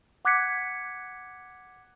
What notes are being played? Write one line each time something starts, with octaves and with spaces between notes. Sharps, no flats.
F#5 D6 F#6 G#6 B6 C#7